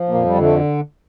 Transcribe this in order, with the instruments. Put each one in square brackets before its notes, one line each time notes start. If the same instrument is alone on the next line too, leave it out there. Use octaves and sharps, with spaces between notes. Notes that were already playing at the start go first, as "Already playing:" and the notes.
Already playing: [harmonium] F3
A#2 A#3
F2
G3
D3
A3